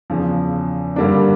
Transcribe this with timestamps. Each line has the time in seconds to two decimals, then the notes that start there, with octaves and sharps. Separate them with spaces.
0.10 E2 C#3 F3
0.96 G2 D3 G3 A#3 D4